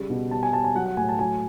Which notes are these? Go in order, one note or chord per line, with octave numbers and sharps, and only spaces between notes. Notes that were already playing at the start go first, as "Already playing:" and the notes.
Already playing: C#3 G3
B2
G3 A5
G#5
G3 A5
G#5
F#3 F#5
F#5
A2 G#5
A5
F#3 G#5